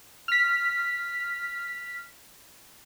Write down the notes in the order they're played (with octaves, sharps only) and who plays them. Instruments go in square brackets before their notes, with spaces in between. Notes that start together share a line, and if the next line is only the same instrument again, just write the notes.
[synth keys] F6 B6